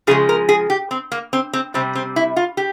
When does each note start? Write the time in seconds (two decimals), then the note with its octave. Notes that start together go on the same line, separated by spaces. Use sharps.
0.07 C#3 F3 G#3 G#4
0.29 A#4
0.49 G#4
0.70 G4
0.91 C4
1.12 A#3
1.33 C4
1.53 C4
1.74 C3 G3 C4
1.95 C4
2.16 E4
2.36 F4
2.57 G4